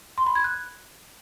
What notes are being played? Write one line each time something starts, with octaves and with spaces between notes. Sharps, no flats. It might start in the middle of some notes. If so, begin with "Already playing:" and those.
C6
B5
G#6
F#6